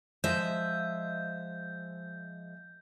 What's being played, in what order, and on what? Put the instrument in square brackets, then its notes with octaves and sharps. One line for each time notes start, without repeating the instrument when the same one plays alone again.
[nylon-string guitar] F3 G#3 D#5 [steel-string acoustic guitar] E5 [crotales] G6